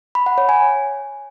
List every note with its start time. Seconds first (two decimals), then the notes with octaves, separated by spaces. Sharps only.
0.15 B5
0.26 F#5
0.38 C#5
0.49 G#5